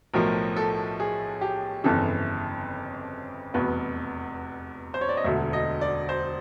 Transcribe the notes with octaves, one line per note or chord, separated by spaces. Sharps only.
B1 A2 F3 A#4
A4
G#4
G4
G1 F2 C#3 E3 A4
F1 E2 B2 B4
C5
C#5
D5
D#5
E1 D2 D3 E5
D#5
D5
C5